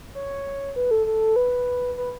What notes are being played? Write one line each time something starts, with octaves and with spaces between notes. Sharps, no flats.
C#5
B4
A4
A4
B4
B4